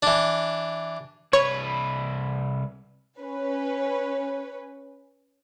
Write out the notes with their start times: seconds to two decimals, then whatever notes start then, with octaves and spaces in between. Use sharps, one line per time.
0.03 E3 D4
1.33 C2 B4 C#5
3.19 C#4 B4